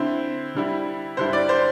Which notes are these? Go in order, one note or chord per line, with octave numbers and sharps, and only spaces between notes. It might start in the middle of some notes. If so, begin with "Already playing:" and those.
Already playing: D3 C4 E4 C5
D3 G3 E4
G2 D3 G3 E4 C5
D5
C5